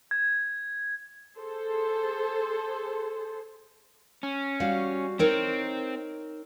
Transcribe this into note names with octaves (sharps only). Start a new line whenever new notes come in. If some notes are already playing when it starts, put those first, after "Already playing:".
G#6
G#4 A4 C5
C#4
G3 F#4 F5
C4 D#4 A#4 C#5